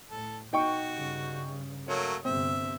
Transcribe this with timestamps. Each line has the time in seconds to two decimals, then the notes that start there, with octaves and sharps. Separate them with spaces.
0.10 A2 A4
0.53 B2 D#4 F#4 G5 C#6
0.92 G2 C#3
1.88 F#3 A3 A#3 C#5
2.25 G1 C3 C4 E5